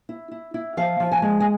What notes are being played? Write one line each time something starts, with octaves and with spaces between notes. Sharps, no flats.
E4
E4
E4
F3 F5
F3
G#5
G#3
G#5